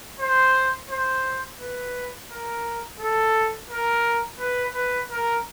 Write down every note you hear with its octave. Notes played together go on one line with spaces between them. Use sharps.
C5
C5
B4
A#4
A4
A#4
B4
B4
A#4